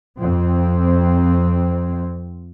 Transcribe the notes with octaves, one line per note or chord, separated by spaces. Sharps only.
F2 C4